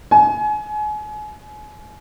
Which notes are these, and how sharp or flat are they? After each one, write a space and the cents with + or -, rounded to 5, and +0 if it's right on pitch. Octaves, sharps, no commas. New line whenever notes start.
G#5 +30